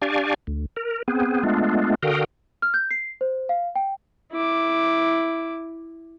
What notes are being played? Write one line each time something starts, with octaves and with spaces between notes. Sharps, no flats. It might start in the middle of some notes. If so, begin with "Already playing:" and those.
D4 G4 D5 F5 G#5 C#6
D2
A#4
B3 C4 G#4
G#3 A3 B3 D4 F4
D3 F#4 A#4 F5 G5 D#6
F6
G6
C7
C5
F5
G5
E4 D6